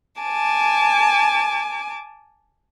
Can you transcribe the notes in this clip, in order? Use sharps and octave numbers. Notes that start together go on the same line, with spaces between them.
G#5 A5 D6